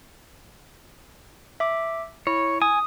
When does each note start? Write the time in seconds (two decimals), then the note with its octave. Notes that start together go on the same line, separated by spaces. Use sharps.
1.60 E5 D6
2.27 E4 C#5
2.62 G#5 D#6